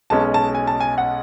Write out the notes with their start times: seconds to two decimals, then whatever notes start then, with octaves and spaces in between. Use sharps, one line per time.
0.10 B1 B2 G#3 C#4 A5
0.34 A5
0.55 G#5
0.67 A5
0.80 G#5
0.98 F#5